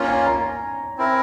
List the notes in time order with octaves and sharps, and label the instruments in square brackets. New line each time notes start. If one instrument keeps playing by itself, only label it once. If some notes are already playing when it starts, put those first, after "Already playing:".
Already playing: [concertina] A#3 C#4 F4 [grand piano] C#5
[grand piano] G#5
A#5
[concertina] C4 E4 A#4